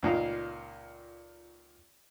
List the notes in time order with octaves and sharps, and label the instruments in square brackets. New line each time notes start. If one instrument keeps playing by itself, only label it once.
[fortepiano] C#2 A#2 D#4 F5